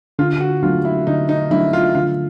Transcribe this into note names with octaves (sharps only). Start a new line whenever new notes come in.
D3 F4
F#4
F#3 A3 D4 F4
E4
D3 D#4
D#4
F#3 A3 D4 E4
F4
D3 F4